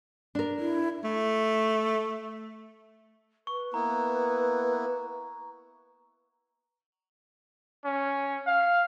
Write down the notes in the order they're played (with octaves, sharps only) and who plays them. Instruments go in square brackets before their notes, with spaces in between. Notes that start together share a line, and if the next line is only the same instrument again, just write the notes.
[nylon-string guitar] D4 A#4
[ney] E4
[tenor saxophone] A3
[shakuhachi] B4 [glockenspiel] C#6
[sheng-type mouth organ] A#3 B3 E4 [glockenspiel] A#5
[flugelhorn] C#4
F5